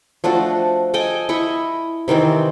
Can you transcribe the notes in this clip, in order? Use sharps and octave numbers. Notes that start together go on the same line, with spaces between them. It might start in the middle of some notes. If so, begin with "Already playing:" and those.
F3 A3 D4 F#4
A4 D#5 G5 G#5
E4 D#5 B5 C#6
C3 D#3 E3 C4